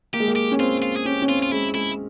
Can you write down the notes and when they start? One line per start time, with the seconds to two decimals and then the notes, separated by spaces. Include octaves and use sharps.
0.14 A#3 G4
0.20 G#3
0.28 A#3
0.36 G4
0.52 C#4
0.59 C4 F4
0.82 F4
0.96 G#4
1.05 C#4 G4
1.22 C#4
1.28 C4 F4
1.42 F4
1.51 G#3 E4
1.75 G#3 E4